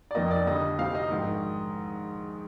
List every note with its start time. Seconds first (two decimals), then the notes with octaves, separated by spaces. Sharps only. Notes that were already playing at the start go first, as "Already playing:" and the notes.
0.11 D5
0.15 F1 F2 D#3 A#3 D#5
0.31 D5
0.46 F2 D3 G3 D#5
0.79 C2 C3 G3 C4 D#4 F5
0.95 D#5
1.10 A#1 G#2 D#3